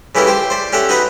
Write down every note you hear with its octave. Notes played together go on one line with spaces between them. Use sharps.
C#3 E3 E4 G4 A4 A#4
G4 C5 G5
C5 D5
C#4 G4 A4 E5 F#5
D#4 F#4 B4 F#5 A#5 B5